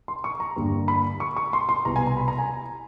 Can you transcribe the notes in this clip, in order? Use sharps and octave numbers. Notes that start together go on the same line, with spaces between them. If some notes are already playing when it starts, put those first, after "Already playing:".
C6
C#6
A#5
G2 D3 G3 A#3
B5
C#6
C#6
C6
C6
C2 B2 G3 B3 A#5
G#5
A#5
B5
A#5
G#5